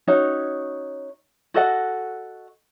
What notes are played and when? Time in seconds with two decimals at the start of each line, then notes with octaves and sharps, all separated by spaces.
0.08 C#4 D#4 F#4 C#5
1.54 F#4 A4 D#5 F#5